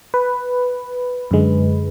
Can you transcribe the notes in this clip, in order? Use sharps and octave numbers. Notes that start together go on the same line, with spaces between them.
B4
F#2 D3 G#3